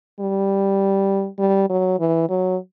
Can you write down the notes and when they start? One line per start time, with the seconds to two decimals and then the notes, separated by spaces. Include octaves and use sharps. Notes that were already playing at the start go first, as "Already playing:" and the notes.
0.21 G3
1.39 G3
1.70 F#3
1.99 E3
2.30 F#3